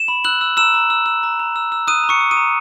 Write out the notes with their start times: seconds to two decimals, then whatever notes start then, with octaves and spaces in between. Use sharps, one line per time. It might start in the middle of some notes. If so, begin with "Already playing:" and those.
Already playing: E7
0.08 B5
0.24 E6 F#6 F#7
0.41 E6
0.57 A#5 E6 E7
0.74 A#5
0.90 E6
1.06 E6
1.23 A#5
1.40 A#5
1.56 E6
1.72 E6
1.88 D#6 F#6 D#7
2.04 A#5
2.09 C#6 C#7
2.20 D#6
2.31 D#6 D#7
2.37 A#5